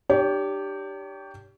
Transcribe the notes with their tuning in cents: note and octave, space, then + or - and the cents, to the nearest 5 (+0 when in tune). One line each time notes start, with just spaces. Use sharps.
D4 +40 G4 +0 C#5 +40